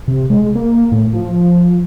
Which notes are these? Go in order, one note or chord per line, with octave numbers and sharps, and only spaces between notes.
C3
G#3
A#3
A2
F3